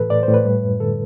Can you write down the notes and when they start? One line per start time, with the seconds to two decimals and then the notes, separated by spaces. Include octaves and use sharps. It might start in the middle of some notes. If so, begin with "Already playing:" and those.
Already playing: A2 E3 A4 B4
0.10 A2 D5
0.23 C5
0.28 A2
0.34 B4
0.45 G3
0.63 F#2
0.80 D3 A4